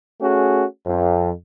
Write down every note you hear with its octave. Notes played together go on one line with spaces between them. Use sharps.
A3 C#4 F#4 G#4
F2